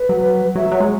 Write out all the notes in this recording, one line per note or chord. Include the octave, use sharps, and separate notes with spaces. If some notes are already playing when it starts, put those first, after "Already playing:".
Already playing: B4
F#3
F#3 E5
F#3
G#3 C#5